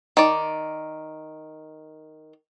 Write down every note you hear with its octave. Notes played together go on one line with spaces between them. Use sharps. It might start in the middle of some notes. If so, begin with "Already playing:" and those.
D#3 D5